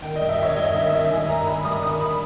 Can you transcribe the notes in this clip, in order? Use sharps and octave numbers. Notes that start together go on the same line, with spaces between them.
D#3 G5
G2 D#5
E5
D#3 C#5
G2 D#5
D#3 E5
D#3 E5
D#3 G#5
G2 A#5
D#3 B5
G2 D#6
D#3 D#6
B5